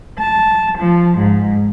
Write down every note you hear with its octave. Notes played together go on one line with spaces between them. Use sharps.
A5
F3
G#2